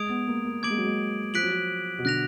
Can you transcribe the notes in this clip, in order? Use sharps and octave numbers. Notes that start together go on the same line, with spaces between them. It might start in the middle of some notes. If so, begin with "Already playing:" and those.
Already playing: G#3 D#6 G#6 D7 F7
B3
A#3
A#3
A#3 D6 G#6 D7 F#7
G#3
F#3
G#3
F3 F#6 B6 D7 F#7
F#3
F3
B2
D3 F#6 A#6 F7